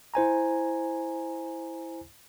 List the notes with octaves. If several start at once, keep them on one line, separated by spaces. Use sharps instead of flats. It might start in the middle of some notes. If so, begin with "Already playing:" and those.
E4 C5 G#5 A#5